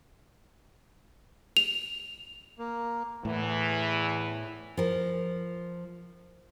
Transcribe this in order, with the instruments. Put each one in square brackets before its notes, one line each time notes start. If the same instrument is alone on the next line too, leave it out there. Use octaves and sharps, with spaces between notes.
[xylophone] F7
[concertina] A#3
[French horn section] E2 E3 [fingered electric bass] A2
[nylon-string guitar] F3 A#4